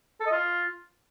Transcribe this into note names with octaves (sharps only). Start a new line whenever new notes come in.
A4
D#5
F4